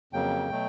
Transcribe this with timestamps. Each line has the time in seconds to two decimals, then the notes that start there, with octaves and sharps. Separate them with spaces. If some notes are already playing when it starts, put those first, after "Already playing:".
0.13 F2 C#3 F#3 A#3 G5
0.50 B2 F#3 A3